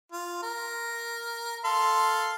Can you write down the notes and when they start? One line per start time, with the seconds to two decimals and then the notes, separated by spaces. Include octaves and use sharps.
0.12 F4
0.43 A#4
1.65 A4 F5 C6